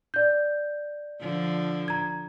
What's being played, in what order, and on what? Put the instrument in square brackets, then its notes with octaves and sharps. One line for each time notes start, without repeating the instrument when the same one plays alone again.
[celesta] D5 G6
[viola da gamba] D3 F3
[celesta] A#5 G#6